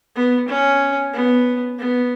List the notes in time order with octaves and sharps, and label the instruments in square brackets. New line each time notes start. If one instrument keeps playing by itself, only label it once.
[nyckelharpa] B3
C#4
B3
B3